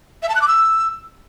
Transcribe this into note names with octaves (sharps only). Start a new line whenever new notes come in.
E5
A5
F#6
D6
E6